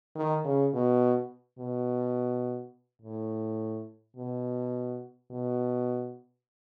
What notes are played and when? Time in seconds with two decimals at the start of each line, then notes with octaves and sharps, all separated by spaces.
0.15 D#3
0.45 C#3
0.73 B2
1.59 B2
3.02 A2
4.16 B2
5.31 B2